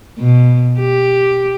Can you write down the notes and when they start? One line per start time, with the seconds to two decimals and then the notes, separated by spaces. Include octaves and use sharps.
0.19 B2
0.80 G4